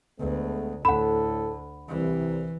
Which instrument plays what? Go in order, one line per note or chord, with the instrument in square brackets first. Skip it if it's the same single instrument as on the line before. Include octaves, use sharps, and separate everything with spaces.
[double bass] D2 [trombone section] G#3 A3 B3
[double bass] D2 [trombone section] A2 A4 [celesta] F#5 B5
[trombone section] C2 [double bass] E3